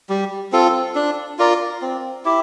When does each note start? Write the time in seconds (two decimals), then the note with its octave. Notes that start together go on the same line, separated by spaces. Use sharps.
0.09 G3
0.52 C4 F4 A4
0.95 D4
1.39 F4 A#4 D5
1.82 C4
2.25 E4 G4